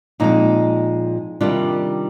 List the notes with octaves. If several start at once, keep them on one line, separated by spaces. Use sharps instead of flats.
A#2 F3 G#3 C4 D#4
C3 D#3 G3 D4 F4